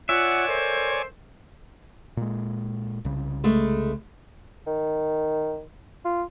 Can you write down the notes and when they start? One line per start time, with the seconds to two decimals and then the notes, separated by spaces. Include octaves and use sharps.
0.09 F4 C#5 D5 E5 F#5 G#5
0.48 A4 A#4 C5
2.17 A#2 G#3
3.05 C2 C#3
3.44 G#3 A3 B4
4.67 D#3
6.05 F4